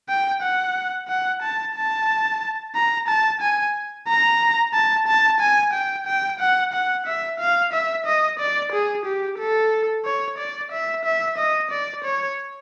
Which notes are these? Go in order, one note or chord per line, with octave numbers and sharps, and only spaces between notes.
G5
F#5
F#5
A5
A5
A#5
A5
G#5
A#5
A5
A5
G#5
G5
G5
F#5
F#5
E5
F5
E5
D#5
D5
G#4
G4
A4
C#5
D5
E5
E5
D#5
D5
C#5